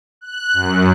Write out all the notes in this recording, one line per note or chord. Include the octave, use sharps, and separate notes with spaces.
F#6
F#2